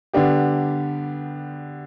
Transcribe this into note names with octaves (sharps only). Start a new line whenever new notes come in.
D3 G3 B3 D4 G4